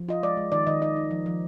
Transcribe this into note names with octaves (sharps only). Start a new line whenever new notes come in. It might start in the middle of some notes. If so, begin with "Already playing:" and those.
Already playing: F3
F4 D#5
G#3 D5
G#3
D#3 D5
D#3 D#5
D#4 D#5
D#4
F3
F3